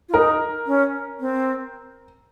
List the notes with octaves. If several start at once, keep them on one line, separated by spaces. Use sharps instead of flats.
F4
D#4 A#4
C#4
C4